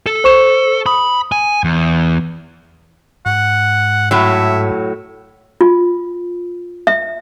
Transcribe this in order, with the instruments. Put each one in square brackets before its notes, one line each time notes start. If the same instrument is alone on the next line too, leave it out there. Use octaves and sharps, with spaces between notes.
[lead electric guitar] A4
[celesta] C5 C#6 E7
[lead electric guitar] B5 [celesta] D#6
[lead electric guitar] G#5
E2
[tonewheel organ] G#2 [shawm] F#5
[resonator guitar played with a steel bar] A2 F#3 [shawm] E5
[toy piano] F4
E5